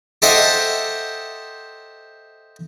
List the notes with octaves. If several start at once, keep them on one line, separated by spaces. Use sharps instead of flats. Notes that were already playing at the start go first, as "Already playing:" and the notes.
G4 A4 C5 D#5 E5 F#5